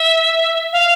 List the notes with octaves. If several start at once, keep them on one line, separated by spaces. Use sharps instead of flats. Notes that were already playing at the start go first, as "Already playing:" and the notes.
Already playing: E5
F5